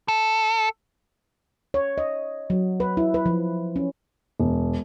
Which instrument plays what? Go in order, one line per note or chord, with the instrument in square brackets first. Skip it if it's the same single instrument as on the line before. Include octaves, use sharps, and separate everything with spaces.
[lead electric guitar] A4
[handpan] C#5
D#5
F#3
B4
E4
B4
F3
C#4
[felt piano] E1